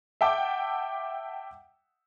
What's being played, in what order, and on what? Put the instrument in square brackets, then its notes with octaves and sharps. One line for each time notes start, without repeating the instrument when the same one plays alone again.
[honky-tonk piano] E5 F#5 G5 A5 D6